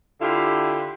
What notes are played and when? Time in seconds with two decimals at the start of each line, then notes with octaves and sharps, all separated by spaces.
0.20 D3 E4 F4 G4